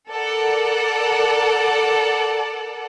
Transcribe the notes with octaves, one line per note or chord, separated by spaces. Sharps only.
A4 A#4 D5 F#5